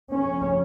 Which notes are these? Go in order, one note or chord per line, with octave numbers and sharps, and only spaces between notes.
F2 C#3 C#4